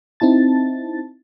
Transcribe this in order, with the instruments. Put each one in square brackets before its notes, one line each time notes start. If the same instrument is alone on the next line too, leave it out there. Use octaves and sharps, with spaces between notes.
[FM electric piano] C4 D#4 E4 A5 A6